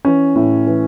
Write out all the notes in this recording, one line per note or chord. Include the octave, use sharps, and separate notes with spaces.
E3 C#4
A2
E3